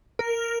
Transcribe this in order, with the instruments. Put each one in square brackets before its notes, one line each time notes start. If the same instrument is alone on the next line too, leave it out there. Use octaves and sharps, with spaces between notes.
[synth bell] A#4